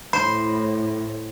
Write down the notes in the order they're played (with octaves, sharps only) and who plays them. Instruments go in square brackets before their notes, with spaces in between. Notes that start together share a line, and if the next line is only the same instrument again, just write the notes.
[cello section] A2 [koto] C5 [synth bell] B5